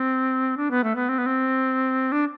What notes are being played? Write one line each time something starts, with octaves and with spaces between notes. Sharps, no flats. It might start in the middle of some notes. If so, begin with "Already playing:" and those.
Already playing: C4
D4
B3
A3
B3
C4
B3
C4
D4